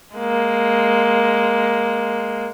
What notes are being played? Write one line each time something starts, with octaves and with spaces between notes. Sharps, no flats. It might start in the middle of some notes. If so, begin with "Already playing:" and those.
G#3 A#3